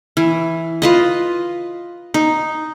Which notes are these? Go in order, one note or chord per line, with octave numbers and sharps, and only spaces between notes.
E3
F4 B4 D#5
D#4